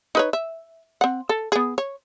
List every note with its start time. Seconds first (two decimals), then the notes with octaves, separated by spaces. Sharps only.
0.15 D#4 B4 C#5
0.33 E5
1.01 C4 F#5
1.29 A4
1.52 B3 G#4
1.78 C#5